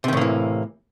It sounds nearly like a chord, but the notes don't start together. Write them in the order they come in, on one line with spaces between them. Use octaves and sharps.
C3 D#3 A2 A#3 E3